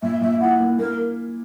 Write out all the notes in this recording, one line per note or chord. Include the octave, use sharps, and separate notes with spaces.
A#2 E5
A#2 E5
E4 F#5
A#3
A#3 A#4